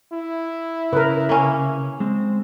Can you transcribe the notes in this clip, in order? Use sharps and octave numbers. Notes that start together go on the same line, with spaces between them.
E4
C#3 A#4 B4
A#3 C#4
G#3 C4